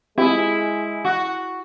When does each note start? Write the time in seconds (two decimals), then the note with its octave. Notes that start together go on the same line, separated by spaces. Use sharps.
0.18 G#3 C4 E4 F4 G4 G#4
1.05 F#4